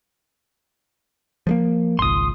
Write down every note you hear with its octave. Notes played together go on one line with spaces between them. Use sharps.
F3 G#3 A#3
G#1 C#2 C6 D#6